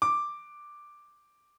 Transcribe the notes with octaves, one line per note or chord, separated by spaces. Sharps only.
D6